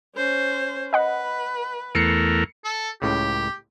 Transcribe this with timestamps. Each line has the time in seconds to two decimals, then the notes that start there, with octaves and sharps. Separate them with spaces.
0.15 C#4 C5
0.93 B4 D#5 F#5 B5
1.95 E2 A3 A#4 C7 C#7
2.64 A4
3.02 C#2 A2 C#3 G4